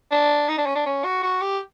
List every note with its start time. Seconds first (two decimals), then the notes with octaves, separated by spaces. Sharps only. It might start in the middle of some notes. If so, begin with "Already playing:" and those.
0.11 D4
0.48 D#4
0.58 D4
0.66 C#4
0.75 D4
0.86 C#4
1.04 F#4
1.23 F#4
1.41 G4